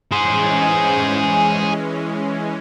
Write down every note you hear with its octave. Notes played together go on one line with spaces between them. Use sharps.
E3 G#3 C#4 G#4 C5